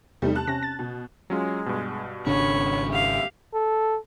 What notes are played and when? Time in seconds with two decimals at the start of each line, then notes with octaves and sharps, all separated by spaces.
0.22 E2 C3 G3 A3 D#4
0.35 A5 F#6
0.47 C3 C#4 A#6
0.63 A6
0.79 B2
1.30 F#3 G#3 C#4 F4
1.66 G2 B2
2.27 G#1 C#3 D4 C#5 B5 C#6
2.89 G4 E5 F5
3.54 A4